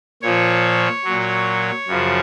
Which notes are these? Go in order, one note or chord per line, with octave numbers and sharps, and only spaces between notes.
A#2 F3 C#5
A#2 F#3
F#2 C#3 F3